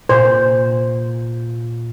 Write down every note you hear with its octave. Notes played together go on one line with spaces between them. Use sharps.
A#2 C5